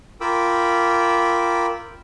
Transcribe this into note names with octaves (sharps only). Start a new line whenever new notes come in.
F4 A#4 G5 B5 D6 E6